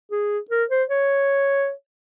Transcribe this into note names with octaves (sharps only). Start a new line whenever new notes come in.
G#4
A#4
C5
C#5